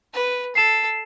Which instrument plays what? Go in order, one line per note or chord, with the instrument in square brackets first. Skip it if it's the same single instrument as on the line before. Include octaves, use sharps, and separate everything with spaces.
[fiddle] B4
[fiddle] A4 [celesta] C7 E7